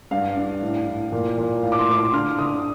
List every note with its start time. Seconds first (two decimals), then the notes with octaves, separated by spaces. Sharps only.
0.11 G2 F5
0.36 D4
0.61 A2
0.87 A2
1.12 A#2
1.38 A#2
1.63 A2 F5
1.72 D6
1.79 C6
1.88 A2 D6
1.96 C6
2.13 D3 F6
2.38 D3 D#6